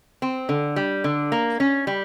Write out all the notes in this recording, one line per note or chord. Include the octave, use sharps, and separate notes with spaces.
C4
D3
G3
D3
A#3
C#4
G3